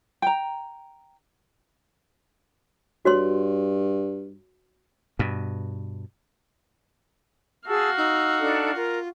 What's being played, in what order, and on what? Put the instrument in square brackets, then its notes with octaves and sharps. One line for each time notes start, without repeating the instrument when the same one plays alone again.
[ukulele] G5 A#5
[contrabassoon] G2 [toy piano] F#4 C#5 C6
[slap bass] G2 B2
[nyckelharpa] F#4 F5 [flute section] G#4 A5 E6
[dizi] D#4 [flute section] E6
[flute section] D4 A4
[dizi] F4 [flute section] A#4